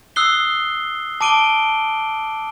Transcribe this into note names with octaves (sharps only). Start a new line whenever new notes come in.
D#6 E6 F#6 C7 G7
A5 D6 D7 D#7 G7